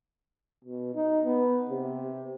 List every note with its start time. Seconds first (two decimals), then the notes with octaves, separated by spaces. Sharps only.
0.65 B2
0.95 D#4
1.25 B3
1.70 C3